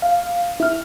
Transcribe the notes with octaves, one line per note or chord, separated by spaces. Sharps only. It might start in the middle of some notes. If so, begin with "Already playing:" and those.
F5
E4 F6